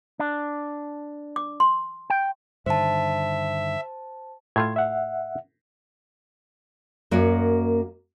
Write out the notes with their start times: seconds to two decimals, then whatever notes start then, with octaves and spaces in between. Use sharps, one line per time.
0.20 D4
1.36 D6
1.60 C6
2.10 G5
2.66 G2 D3 D#3 C5 E5 A5
4.56 A2 A3 F4 C6 G#6
4.76 E5 F#5
7.11 F#2 A#3 F#4 C#5 D5